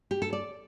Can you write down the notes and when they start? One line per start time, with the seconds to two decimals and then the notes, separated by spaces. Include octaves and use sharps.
0.11 G4
0.22 A4
0.33 D5